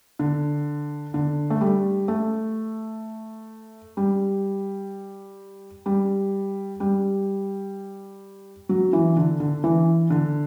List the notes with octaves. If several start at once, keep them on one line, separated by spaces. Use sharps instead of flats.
D3
D3
A3
G3
A3
G3
G3
G3
F#3
E3
D3
D3
E3
D3